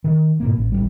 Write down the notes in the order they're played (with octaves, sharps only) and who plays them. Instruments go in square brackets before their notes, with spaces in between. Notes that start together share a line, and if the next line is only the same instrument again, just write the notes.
[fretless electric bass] D#3
G#2 B2 A#3
A1
D1 A1 E2 G3